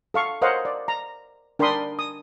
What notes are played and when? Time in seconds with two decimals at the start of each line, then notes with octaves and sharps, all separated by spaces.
0.14 A4 F5 C#6
0.42 A#4 C5 C#5 D#5 F5 F#5
0.65 D5
0.88 A#5
1.59 D4 A#4 G5 B5 C6 D#6
1.99 D#6